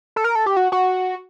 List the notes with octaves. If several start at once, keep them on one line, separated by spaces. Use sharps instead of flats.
A4
A#4
A4
G4
F#4
F#4